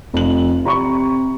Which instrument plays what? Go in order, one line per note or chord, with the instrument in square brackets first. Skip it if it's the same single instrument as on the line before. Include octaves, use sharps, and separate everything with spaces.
[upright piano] F1 F#7 [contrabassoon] F2
[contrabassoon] C3 [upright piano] A#5 B5 C#6